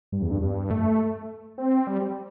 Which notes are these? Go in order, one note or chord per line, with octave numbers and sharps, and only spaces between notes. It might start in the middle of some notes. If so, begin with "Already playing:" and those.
G2
E2
G2
G2
A3
C4
G3
G3